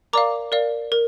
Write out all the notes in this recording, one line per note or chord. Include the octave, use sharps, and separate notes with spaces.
A#4 D5 F5 A#5 D6
A#4 D5 F5
A#4